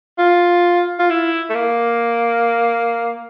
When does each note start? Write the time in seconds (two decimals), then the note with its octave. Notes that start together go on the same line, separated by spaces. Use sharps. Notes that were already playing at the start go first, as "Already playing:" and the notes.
0.18 F4
0.99 F4
1.10 E4
1.50 A3
1.55 A#3